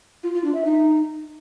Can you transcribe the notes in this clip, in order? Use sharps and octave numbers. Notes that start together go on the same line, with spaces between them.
F4
F4
D4
E5
D#4